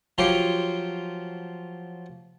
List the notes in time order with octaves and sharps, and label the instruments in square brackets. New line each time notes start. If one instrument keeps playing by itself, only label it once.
[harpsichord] F3 F#3 F4 G4 C5 C#5